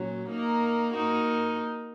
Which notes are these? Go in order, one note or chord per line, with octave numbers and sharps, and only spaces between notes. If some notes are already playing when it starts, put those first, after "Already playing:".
Already playing: A#2 F#3 C#4
A#3 D#4 A#4
A#3 D#4 F#4 A#4